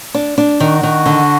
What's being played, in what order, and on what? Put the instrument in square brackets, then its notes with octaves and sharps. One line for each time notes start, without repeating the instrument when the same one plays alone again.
[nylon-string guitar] D4
D4
[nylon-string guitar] D#3 [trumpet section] F#4
[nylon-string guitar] D#3
D3